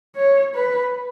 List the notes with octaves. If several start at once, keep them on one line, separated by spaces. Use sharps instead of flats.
C#5
B4